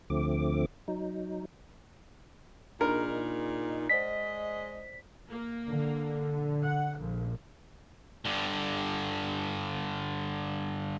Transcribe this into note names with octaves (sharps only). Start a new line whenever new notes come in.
D2 D3 F3 A3 C4 D6
F#3 D#4
A#2 D4 D#4 G#4 A#4
G#3 C5 D5 D#5 B6
A#3
D3
F#5
A#1
G2 D3